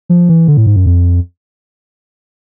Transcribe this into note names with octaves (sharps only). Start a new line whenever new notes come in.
F3
E3
D3
A2
G#2
F#2
F2